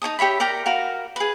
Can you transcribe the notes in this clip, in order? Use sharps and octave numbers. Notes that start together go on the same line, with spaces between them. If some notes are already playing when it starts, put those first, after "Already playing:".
D#4 C#5 A5 D#6
G4 C#5 E5 B5
A#4 D5 G5 A#5
F#4 A#4 F5
G#4 B4